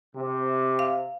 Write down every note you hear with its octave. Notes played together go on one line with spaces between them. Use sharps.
C3
F5